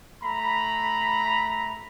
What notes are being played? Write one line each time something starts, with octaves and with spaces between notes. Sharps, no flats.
A3 A#5 B5